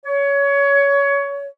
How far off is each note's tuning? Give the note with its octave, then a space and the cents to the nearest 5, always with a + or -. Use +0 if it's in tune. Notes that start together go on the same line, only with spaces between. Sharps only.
C#5 +20